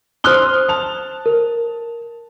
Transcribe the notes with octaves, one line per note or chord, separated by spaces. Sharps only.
C5 C6 D#6 F6 F#6 G7
A5 F7
A#4